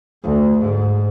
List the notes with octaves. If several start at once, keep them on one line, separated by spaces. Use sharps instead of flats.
D2
G#2